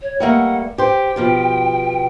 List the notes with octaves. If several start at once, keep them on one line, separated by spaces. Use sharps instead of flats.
C#5
G3 A3 A#3 F#5
G4 C5 G5
B2 F3 G4